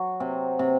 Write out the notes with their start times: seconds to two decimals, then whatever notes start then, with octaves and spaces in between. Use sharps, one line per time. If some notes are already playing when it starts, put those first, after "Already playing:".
Already playing: F#3 F#4
0.20 C3
0.59 C3